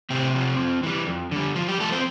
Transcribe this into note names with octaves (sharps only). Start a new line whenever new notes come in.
A2 C3 C4
F3
F2
E3 G3
F2
D3 G3
G2 F3 F4
G3 G4
F3 A3 A4
C4 C5